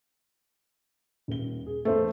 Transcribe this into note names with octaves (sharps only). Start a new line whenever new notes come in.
D#1 G7
G#4
E2 A3 C5 E5